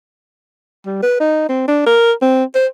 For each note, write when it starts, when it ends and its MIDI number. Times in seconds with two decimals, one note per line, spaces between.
0.86 0.98 55
1.03 1.18 71
1.20 1.44 63
1.49 1.64 60
1.68 1.83 62
1.86 2.13 70
2.22 2.44 60
2.55 2.67 72